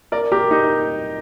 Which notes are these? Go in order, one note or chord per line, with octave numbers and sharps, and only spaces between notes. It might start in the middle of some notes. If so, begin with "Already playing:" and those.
A#4 D5
G4 A#4
D#4